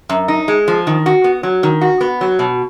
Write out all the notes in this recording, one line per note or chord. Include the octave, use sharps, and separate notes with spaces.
F#2
D#4
G#3
F3
D#3
F#4
B3
F#3
D#3
F#4
B3
F#3
B2